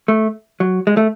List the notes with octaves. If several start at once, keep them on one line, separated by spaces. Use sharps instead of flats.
A3
F#3
G#3
A3